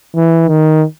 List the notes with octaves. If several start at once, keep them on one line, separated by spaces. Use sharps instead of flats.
E3
D#3